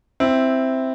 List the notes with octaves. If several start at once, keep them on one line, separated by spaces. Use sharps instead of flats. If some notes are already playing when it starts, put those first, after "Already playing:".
C4 E4